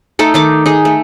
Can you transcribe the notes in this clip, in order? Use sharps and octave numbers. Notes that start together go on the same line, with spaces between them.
A3 D#4 A4
D#3 D#4 D6
D#4 G#4
A3